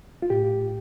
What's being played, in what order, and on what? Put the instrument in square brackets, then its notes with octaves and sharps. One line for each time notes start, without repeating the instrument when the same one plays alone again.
[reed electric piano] F4
A2 G4